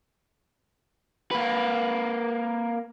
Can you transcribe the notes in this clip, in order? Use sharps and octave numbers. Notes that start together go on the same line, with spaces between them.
A#3 B4